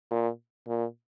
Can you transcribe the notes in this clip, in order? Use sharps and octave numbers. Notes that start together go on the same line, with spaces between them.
A#2
A#2